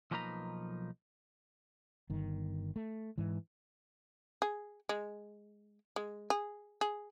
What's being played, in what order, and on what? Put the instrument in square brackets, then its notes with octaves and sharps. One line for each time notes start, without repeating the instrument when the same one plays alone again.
[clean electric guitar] B1 F3 A#3 D#4 B4 A#5
[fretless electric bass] G1 D#3
A3
G#2 E3
[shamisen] G#4
G#3
G#3
G#4
G#4